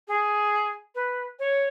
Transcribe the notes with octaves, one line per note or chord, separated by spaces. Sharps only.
G#4
B4
C#5